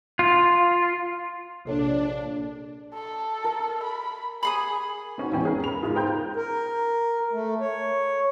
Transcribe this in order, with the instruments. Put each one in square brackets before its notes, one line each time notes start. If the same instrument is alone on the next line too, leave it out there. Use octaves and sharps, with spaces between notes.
[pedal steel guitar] F4
[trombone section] A#1 [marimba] C3 A4 C#5 [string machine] D4
[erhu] A4
[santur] A#4
[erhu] B5
[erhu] G#4 [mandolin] B5 C6 D#6
[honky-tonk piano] C4 C#4 D#4 F#4
G#1 E2 C#4 G5
G#3 G#4 A#4
A#4 B5 F7
G#2 G#3 F4 D#6
A#4 C5 G5 A#5 G6
[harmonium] A#4
A3
C#5